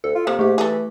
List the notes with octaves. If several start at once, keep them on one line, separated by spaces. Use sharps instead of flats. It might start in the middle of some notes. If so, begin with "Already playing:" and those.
D2 A4
F4
C3 A#3
G#2 A3 G4
E3 G#4 A4